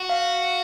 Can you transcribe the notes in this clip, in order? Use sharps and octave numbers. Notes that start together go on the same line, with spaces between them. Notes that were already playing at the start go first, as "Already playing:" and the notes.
Already playing: F#4
F5